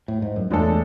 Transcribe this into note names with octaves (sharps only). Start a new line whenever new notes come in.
A2
G#2
F#2
E2 A2 G#3 D4 A4